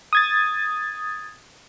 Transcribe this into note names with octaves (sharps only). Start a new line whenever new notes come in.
D#6 G#6 A6